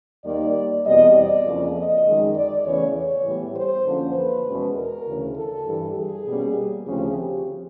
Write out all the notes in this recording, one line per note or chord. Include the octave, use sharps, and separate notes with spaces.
D#2 D#3 G3 A#3 D5
E2 B2 G3 C4 D#5
D5
F2 C#3 F3 A#3
D#5
F#2 D#3 G#3
D5
E2 C#3 E3 A3 C#5
C#5
A2 E3 G3 B3
C5
F#2 D3 F3 A#3 C#4
B4
E2 B2 G#3 C#4
A#4
D2 C#3 E3
A4
G2 E3 G3
G#4
B2 G3 A#3 C#4
D2 C#3 F3 A3 C4 G4